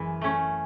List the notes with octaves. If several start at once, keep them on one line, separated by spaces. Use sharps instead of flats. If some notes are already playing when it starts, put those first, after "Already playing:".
Already playing: F#2 E3 G#3
A3 C#4